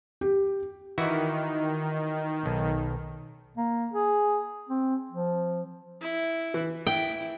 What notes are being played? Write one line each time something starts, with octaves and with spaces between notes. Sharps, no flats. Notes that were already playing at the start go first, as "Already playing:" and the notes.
G4
D#3 E3 E4 F#4
B1
A#3
G#4
C4
F3
E4
E3
E4 G5